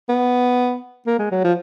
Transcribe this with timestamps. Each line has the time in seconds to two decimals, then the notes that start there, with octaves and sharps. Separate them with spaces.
0.09 B3
1.07 A#3
1.19 G#3
1.31 F#3
1.44 F3